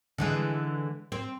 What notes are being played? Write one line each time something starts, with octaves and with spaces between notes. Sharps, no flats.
D3 E3 G#3
C4